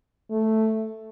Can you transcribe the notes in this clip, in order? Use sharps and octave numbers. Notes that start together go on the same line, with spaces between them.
A3